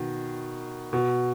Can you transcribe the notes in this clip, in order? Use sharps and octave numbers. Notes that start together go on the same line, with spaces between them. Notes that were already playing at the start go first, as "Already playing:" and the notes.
Already playing: B2 D#3
B2